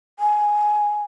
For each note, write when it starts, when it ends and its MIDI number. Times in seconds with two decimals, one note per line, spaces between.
0.19 1.00 80